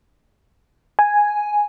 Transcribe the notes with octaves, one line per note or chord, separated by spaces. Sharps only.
G#5